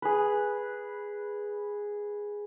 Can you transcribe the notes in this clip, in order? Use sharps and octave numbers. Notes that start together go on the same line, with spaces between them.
G#4 B4